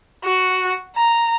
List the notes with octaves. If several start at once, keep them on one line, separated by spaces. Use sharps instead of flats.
F#4
A#5